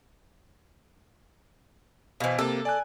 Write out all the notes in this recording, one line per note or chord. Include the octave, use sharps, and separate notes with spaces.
B2 E3 C5 F5
C3 A#3 A4
D5 G#5 F#6